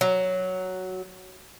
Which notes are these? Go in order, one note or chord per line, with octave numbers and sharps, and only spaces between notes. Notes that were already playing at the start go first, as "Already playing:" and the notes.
F#3